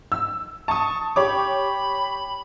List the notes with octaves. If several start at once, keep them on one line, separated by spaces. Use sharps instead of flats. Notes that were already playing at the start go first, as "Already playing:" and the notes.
E6
A5 C#6 D#6
G4 C#5 B5 D6